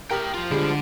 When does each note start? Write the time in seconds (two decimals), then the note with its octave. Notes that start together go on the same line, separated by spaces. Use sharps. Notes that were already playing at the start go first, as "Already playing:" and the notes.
0.11 E4 G4 A#4 G5
0.34 F4 C5
0.51 D3 G3 G#3